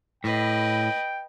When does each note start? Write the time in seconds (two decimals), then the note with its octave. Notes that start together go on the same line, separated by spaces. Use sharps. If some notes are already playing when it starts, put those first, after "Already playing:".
0.24 A2 B4 D#5 G5